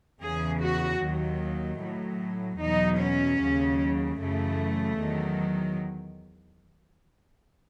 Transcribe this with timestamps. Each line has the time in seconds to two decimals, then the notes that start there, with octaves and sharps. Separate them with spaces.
0.23 E2 C#3 E3 G#4
0.62 F#4
1.02 D#2 D#3 F#3
1.81 A2 F#3
2.61 E2 B2 F#3 D#4
3.01 C#4
3.41 D#2 C#3 F#3
4.20 F#2 C#3 E3 A3
5.00 E2 D#3 F#3